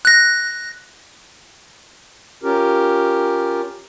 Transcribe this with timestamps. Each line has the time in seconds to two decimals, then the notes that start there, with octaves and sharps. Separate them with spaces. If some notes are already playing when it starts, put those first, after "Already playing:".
0.05 F#6 A#6
2.43 C#4 F4 G4 A#4